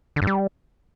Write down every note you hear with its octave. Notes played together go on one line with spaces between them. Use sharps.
D3
G2
G3